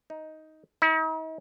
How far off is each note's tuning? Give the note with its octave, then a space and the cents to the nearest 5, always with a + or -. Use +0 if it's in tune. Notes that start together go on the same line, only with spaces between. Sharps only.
D#4 +10
D#4 +45